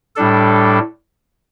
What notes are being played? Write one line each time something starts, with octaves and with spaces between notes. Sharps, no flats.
A2 G3 D4 A4